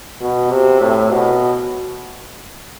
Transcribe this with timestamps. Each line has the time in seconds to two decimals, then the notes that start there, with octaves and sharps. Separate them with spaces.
0.21 B2
0.51 C3
0.81 A2
1.11 B2